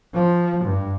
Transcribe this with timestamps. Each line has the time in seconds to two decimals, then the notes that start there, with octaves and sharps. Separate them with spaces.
0.14 F3
0.65 G2